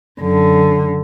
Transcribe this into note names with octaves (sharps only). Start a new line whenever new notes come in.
F#2 D3